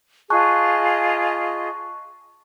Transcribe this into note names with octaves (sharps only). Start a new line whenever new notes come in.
F4 G#4 D#5 A5 C#6 F#6